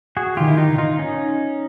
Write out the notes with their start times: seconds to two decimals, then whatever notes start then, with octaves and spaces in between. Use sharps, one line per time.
0.17 F#4 G#4
0.37 D#3 F4 G4
0.48 E4
0.57 D#4 F4
0.78 D#4 F4
0.99 C#4 D#4